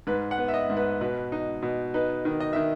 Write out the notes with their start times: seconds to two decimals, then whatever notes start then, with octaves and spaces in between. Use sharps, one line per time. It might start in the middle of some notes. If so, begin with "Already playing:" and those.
0.07 G#2 B4
0.31 F#5
0.38 B3
0.48 E5
0.54 D#5
0.70 G#2
0.77 B4
1.01 B2 B4
1.32 D#4
1.62 B2
1.94 D#4 B4
2.25 D#3
2.40 D#5
2.53 D#3 E5